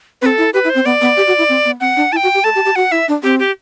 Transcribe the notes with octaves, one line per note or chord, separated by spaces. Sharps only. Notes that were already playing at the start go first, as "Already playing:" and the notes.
C4 B4
A4
E4
G4 B4
E4
C5
C4
B3 D5
B3
G4
F#4
E4
C4
B3
C4 F#5
D4
E4 A5
G5
F#4
G4
A4 A5
G4
G4
F#4 F#5
E4 E5
D4
C4 G4
G4